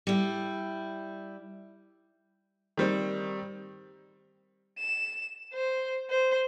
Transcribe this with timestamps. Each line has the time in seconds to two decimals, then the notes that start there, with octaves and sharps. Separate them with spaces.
0.07 G3 E4
2.77 D#3 G3 C4
4.79 E7
5.54 C5
6.10 C5